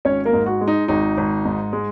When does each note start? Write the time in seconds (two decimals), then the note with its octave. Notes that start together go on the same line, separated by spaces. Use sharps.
0.05 G#1 C#4 C#5
0.25 A#3 A#4
0.33 G#2
0.46 F#4
0.61 G#3
0.68 D#4
0.88 G#1 D#4
1.18 G#1
1.45 G#2
1.73 G#3